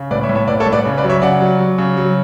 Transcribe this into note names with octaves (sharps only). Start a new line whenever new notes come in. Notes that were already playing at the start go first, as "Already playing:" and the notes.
Already playing: C#3
A2 B4 D5
C#5 E5
A2
C#5 E5
A2 B4 D5
A4 C#5
A2
B4 D5
C#3
B4 D5
F#3
C#5 E5
C#3 D5 F#5
F#3
F#3
C#3
F#3